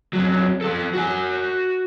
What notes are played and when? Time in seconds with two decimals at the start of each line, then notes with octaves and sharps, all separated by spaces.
0.13 F2 F#3
0.61 F3 A4
0.93 F#4 G#5